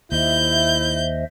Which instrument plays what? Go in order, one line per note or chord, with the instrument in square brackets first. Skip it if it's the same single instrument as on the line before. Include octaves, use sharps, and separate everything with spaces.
[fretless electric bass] D#2 [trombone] E4 [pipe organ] C5 D#5 E5 [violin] G6